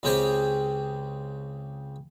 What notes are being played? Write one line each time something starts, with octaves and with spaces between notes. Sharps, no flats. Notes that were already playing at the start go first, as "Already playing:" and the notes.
C#2 C#3 C4 G4 G#4 C5